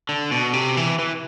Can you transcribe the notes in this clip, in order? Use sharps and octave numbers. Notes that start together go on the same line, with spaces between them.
D3
B2
C3
E3
E3